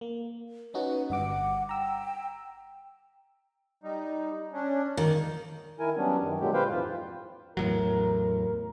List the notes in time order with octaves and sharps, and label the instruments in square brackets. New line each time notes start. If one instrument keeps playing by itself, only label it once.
[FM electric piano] A#3
[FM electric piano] C#4 D#4 F#4 [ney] B4
[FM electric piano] G1 G2 D6 [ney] F#5
[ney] G5 [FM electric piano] A#5 E6
[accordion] G3 D#4
C#4 D4
[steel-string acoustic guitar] D#3 [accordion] A#3
[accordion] D#3 E4 A#4 G#5
F#3 G3 B3 C#4 D4
F#2 D#3
A#2 D3 F#3 G#3 G4
B4 C5 F5 G5
F2 G#2 E3 F4
[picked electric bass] E2 A2 F#3 [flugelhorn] A#4